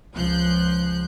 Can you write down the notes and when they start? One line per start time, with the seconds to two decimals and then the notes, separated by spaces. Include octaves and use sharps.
0.16 C#2 F3 F#6 G6